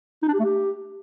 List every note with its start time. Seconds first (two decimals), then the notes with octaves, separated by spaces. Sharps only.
0.23 D#4
0.28 D4
0.34 G4
0.39 A3
0.45 G4